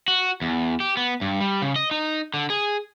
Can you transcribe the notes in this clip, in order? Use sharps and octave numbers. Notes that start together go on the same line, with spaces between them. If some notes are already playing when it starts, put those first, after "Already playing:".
F#4
E2
G4
B3
G2
G3
C#3
D#5
D#4
D3
G#4